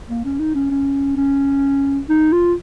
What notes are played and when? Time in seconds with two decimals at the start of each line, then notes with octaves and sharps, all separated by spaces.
0.09 A#3
0.25 C#4
0.39 D#4
0.55 C#4
0.71 C#4
1.17 C#4
2.09 D#4
2.32 F4